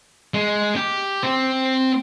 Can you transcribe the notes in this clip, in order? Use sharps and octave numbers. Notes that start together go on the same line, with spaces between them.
G#3
G4
C4